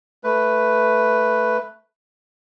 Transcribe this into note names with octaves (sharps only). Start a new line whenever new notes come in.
A3 B4